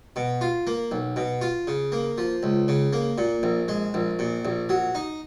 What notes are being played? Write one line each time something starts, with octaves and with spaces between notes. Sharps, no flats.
B2
F4
A#3
B1
B2
F4
C#3
A#3
F3
C#2
C#3
A#3
A#2
A#1
G#3
A#1
A#2
A#1
F#3
D#4